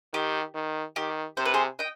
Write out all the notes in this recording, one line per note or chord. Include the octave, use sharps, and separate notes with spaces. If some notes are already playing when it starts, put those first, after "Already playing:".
D#3 G4
D#3
D#3 G4
C3 C5
B4
G#4 C5
D#5 G5